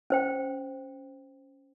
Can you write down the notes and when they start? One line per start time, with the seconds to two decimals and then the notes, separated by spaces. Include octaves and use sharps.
0.10 C#4 C5 G5